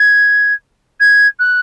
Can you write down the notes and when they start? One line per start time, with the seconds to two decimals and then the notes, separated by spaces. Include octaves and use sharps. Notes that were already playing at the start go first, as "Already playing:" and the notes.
Already playing: G#6
1.00 G#6
1.40 F#6